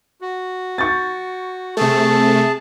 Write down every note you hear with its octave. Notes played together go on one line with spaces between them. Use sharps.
F#4
C#6 G6 A6
C3 A3 G#4 A5